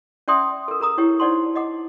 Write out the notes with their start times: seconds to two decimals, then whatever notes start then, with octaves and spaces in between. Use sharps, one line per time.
0.28 C#4 D5 E5 G5 C6 D#6
0.68 A4 A#4
0.80 G#4 A#4 A#5 D#6
0.98 E4 G4 C#5 G5
1.20 D#4 C5 D5 F#5 A5 C6
1.56 D#5 F#5 D6